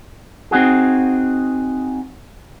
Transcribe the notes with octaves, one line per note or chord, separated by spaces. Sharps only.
C4 D#4 F#4 G#4